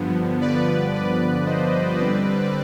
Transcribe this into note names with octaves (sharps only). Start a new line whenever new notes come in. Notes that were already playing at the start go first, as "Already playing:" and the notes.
Already playing: G2 D3 F3 B3
B4 D5
B4 D5
C5 D#5
D3 G3 C4 B4 D5